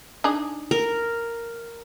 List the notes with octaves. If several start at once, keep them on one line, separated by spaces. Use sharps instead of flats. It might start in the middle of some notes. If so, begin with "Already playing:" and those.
D4 D#4 G#4
A#4